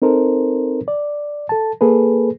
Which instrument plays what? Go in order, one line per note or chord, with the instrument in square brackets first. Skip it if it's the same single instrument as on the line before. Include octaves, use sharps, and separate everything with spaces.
[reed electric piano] C4 D#4 A4 A#4 C5
D5
A4 A5
A#3 G#4 A4 B4